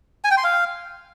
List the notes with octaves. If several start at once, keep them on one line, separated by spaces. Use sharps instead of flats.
G#5
G5
C6
F5